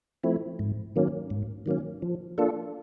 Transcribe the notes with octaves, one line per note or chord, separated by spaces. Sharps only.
F3 A3 C4 E4
G#2
D#3 F#3 A#3 C#4
G#2
D#3 F#3 A#3 C#4
F3
A#3 D4 F4 A4